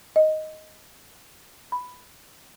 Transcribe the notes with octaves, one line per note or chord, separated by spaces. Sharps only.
D#5
B5